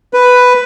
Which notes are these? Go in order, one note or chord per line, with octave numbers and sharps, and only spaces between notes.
B4